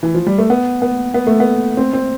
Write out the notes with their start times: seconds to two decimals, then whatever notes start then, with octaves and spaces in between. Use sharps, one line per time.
0.03 E3
0.14 F3
0.27 G3
0.38 A3
0.50 B3
0.82 B3
1.14 B3
1.27 A3
1.40 B3
1.77 C4
1.93 C4